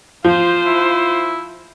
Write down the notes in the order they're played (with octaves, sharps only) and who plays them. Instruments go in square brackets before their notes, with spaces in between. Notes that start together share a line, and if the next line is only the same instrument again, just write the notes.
[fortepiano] F3 [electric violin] F4 C5
[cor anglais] E4